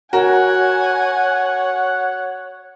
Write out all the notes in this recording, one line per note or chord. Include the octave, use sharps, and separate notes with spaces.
F#4 A#4 C#5 F#5 G#5